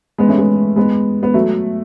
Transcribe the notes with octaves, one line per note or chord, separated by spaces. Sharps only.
G#3 B3
A3 C#4
G#3 B3
G#3 B3
B3
F#3 A3